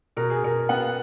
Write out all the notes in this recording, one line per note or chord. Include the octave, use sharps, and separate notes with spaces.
B2 A#4
G#4
B2 A#4
B3 F#5